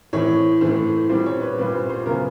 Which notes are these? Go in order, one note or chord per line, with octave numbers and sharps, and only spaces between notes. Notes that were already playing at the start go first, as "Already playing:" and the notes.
A2 E3 A3 C4 C#5
A2 E3 A3 C4 C5
A#2 G3 C4 C5
C#5
B4
A#2 G3 C4 B4
C5
C5
C#3 F#3 B3 A#4